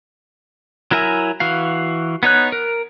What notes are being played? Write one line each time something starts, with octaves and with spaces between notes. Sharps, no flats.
F#3 E4 A#4 E5 G#5
E3 F#4 F5
B3 D#4 C#5 F#6
A#4